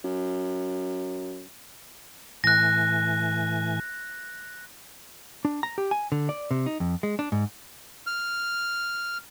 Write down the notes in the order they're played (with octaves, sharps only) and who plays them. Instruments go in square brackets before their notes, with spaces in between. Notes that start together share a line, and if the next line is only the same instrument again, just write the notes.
[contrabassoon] F#2
[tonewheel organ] A2 E3 G#5 [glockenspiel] F#6 A#6
[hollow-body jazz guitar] D4
A#5
G4
G#5
D3
D5
C3
D#4
F2
G#3
D4
G#2
[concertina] F6